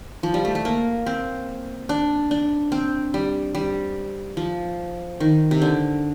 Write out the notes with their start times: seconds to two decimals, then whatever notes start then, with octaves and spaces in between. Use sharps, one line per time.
0.23 F3
0.34 G3
0.45 A3
0.55 A3
0.65 A#3
1.06 C4
1.89 D4
2.31 D4
2.72 C4
3.14 G3
3.55 G3
4.37 F3
5.20 D#3
5.51 C3
5.62 D3